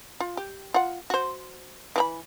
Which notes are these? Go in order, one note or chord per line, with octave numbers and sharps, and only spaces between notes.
F4
G4
F4 F#5
F#4 C5
E3 G#4 B5